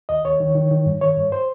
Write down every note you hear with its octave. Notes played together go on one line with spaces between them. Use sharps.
D#2 D#5
D#2 C#5
D#3
D#3
D#3
G2
D#3 C#5
G2
C5